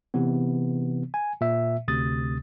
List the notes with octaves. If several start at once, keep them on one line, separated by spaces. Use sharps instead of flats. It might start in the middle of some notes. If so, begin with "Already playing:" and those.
C3 E3 B3
G#5
A#2 E5
D2 C3 D#6 A6